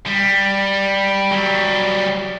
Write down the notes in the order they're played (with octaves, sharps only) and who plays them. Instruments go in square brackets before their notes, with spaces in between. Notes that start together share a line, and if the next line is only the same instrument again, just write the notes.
[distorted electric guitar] G3
F#3 G3